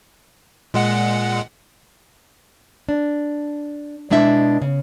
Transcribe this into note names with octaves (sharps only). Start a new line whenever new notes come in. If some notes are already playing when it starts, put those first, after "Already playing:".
A#2 G#3 F#5
D4
B2 G#3 D4 E4 E5
C#3